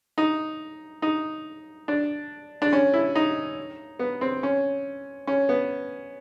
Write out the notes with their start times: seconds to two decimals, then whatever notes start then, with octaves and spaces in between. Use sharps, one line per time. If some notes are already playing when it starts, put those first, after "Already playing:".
0.18 D#4
1.02 D#4
1.88 D4
2.62 D4
2.73 C#4
2.94 E4
3.15 D#4
3.99 B3
4.21 C4
4.43 C#4
5.27 C#4
5.49 B3